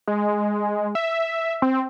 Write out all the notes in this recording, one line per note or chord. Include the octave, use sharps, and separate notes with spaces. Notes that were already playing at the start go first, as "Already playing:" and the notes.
G#3
E5
C4